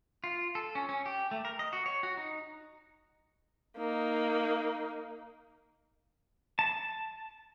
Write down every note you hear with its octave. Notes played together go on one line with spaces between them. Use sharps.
F4
A4
C#4
C#4
G4
A3
A#4
D#5
F#4
C#5
F#4
D#4
A#3 D#4
A5